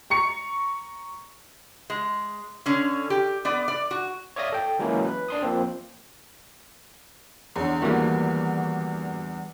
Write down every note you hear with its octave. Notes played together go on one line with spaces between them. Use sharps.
A#5 C#6 C#7
G#3
D3 C#4
G4
B3 D5
D5
F#4
C#5 D5 E5 F5 D#6 A#6
A4 G5
E3 F#3 G#3 A#3 C#4 E4
B4
D4 C6 D#6
F3 A#3 C4
E2 D3 C#5 C6
D#3 E3 G3 A3 A#3 F#4